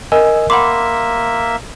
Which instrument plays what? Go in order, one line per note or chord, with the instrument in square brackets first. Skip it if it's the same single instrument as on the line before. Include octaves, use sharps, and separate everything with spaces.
[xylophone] A#4 [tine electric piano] D#5 G#5 E6
[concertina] A#3 E5 [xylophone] F#5 B5 D6 [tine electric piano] C6